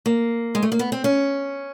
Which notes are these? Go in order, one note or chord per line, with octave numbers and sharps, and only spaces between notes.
A#3
G#3
A3
A#3
B3
C4
C#4